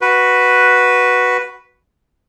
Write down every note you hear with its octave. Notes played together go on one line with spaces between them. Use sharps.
F#4 B4